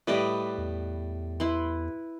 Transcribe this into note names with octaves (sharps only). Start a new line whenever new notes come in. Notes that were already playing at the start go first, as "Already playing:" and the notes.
A2 G3 B4 D5 D#5
E2
E4 B4 C6